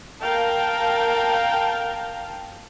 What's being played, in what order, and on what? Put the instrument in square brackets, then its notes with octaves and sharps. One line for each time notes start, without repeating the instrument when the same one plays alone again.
[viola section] A#4 F5 G5 A5